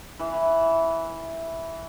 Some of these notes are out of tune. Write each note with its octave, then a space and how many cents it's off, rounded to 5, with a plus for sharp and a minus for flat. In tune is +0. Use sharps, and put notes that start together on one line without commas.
E3 -5